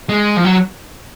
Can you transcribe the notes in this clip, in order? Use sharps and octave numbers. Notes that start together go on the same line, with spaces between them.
G#3
F3
F#3